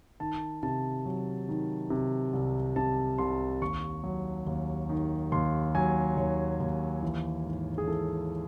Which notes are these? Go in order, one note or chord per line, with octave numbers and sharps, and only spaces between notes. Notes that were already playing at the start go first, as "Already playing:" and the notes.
D#3 A5
C3 A5
F#3
D#3
C3
C2
C3 A5
C2 C6
D#2 C#6
F#3
D#2
D#3
D#2 C6
F#3 G#5
D#2 C#5
D#2
E3
G#2
G#4
E3 A4